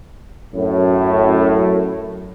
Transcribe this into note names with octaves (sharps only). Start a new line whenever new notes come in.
F#2 A2